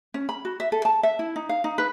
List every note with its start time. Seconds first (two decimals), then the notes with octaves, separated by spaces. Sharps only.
0.14 C#4
0.29 B5
0.45 F#4
0.60 E5
0.72 A4
0.85 A5
1.03 E5
1.19 E4
1.36 D#4
1.49 F5
1.64 D#4
1.78 B4